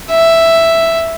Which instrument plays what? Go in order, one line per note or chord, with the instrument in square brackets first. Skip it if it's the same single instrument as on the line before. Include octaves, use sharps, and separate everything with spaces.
[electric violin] E5